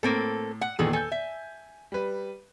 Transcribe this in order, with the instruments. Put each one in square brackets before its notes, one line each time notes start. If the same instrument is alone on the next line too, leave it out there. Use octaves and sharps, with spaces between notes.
[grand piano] A2 [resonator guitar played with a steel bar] A#3 C4 A4
[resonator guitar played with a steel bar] F#5
[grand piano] E2 A#2 D#3 [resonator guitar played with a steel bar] G#4 A4
[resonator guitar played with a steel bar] A4 [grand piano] G#5 G6
[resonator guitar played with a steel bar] E5
[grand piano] G3 B4